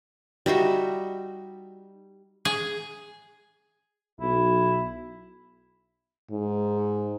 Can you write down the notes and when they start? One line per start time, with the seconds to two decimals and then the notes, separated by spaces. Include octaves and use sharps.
0.46 G3 D#4 F#4 E5
2.45 G#4
4.20 B1 E4
6.31 G#2